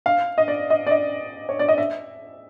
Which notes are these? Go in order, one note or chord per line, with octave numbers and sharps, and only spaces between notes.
F5
D#5
D5
D#5
D5
D#5
C#5
D5
D#5
E5